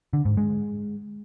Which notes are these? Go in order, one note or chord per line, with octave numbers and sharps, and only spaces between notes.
D3
G#2
G#3